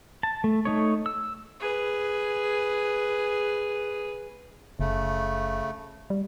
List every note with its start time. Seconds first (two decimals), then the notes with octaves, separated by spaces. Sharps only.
0.23 A5
0.44 A3
0.65 A3 D#4 C#5
1.06 E6
1.60 G#4 B4
4.80 F#1 C#3 A3
6.10 G3